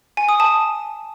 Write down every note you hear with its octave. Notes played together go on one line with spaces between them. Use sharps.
G#5
D#6
A5